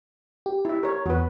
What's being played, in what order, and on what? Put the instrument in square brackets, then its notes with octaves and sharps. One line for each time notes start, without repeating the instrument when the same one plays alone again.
[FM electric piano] G4
[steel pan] E4 E5
A#4 C#5
[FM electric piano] E2 [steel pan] F#4 B4